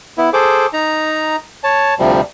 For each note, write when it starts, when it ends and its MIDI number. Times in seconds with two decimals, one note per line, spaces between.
0.18 0.30 59
0.18 0.30 64
0.33 0.67 68
0.33 0.67 69
0.33 0.67 72
0.33 0.67 86
0.73 1.36 63
0.73 1.36 82
1.64 1.94 73
1.64 1.94 81
1.99 2.21 38
1.99 2.21 48
1.99 2.21 53
1.99 2.21 55